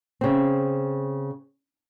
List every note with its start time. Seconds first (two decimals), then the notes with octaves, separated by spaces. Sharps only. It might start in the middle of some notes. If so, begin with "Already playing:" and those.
0.21 C#3 C4